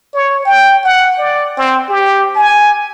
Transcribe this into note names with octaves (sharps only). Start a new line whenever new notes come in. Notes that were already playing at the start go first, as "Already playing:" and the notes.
C#5
G5
F#5
D5
C4
G4
G#5